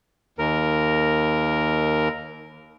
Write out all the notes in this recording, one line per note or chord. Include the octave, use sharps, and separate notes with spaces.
D#2 A#4